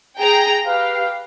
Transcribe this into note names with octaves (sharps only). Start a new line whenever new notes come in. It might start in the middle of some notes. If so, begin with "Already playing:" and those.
G#4 G5 A#5
G4 B4 F5